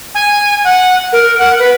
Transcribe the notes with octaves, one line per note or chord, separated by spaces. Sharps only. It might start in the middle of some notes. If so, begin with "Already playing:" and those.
G#5
F#5
A#4
F#5
B4